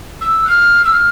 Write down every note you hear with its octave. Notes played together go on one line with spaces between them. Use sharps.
E6
F#6
F6
E6
F6